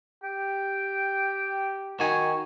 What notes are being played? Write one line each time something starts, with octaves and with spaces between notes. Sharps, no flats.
G4 G5
D#3 F#4 G#5 C#6